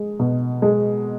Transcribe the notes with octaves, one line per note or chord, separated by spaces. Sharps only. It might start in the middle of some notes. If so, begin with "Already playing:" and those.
Already playing: G#3
B2
G#3